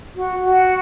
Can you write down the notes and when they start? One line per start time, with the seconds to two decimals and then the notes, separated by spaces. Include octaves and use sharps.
0.16 F#4
0.43 F#4